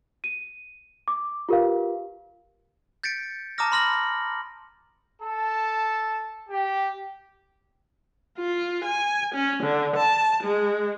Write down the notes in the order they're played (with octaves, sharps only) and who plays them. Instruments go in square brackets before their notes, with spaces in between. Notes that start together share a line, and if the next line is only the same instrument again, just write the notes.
[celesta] D#7
D6
F4 G4 A#4 B4 F5
[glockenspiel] G6 A6 B6 C#7 D7
A5 A#5 D6 D#6 F6 A#6
B5 C6 F6 A#6 F#7
[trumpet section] A4 A5
G4
[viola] F4
G#5
C#4
D3
A5
G#3